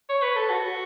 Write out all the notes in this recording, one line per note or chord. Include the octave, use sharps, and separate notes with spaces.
C#5
B4
A4
F#4